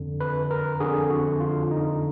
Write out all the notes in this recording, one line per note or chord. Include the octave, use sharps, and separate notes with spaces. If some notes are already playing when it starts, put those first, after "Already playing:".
Already playing: F2 D3
B4
A#4
F2 D3 G#4
F#4
F4
D#4